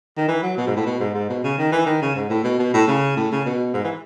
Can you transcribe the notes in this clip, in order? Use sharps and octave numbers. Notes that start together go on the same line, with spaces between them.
D#3
E3
F#3
B2
G#2
A2
B2
G#2
G#2
B2
C#3
D#3
E3
D#3
C#3
G#2
A2
B2
B2
A2
C#3
A2
C#3
B2
G#2
E3